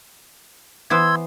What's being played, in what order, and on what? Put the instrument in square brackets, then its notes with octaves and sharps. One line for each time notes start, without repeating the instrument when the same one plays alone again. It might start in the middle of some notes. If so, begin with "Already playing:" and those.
[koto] E3 B3 C5 [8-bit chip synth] C6 E6 G#6